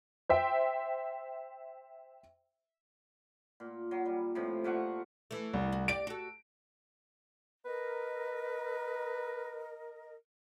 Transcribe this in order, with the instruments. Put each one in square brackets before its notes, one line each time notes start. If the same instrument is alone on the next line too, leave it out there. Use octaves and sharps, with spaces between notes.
[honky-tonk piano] C5 E5 G5
[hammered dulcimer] A#2
F#3
G3
A2 C3 F3
A#2 A3 F#5 C#6
[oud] E3 A3
[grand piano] C2
[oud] F#4
[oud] G4 D5 [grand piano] D7
[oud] F#4 A4
[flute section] A#4 D#5 [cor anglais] B4